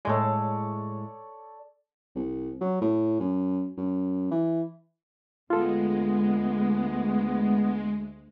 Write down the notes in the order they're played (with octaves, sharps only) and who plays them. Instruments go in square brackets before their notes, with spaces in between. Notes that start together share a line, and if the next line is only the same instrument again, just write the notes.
[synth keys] A2 G#3 [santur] A4 C#5 D5
[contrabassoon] C2
F#3
A2
F#2
F#2
E3
[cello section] D2 [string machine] G#3 [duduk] B3 [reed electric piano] F4 A4